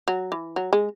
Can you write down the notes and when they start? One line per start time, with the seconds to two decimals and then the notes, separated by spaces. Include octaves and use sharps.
0.08 F#3
0.32 E3
0.56 F#3
0.73 G#3